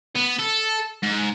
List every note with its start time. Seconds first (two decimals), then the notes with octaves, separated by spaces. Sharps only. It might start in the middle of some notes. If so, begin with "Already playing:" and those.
0.15 B3
0.40 A4
1.03 G#2